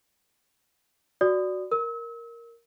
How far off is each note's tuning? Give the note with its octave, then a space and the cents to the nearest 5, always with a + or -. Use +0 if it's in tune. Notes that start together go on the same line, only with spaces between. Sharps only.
F#4 +0 D5 +0 D#6 -15
A#4 +0 E6 -35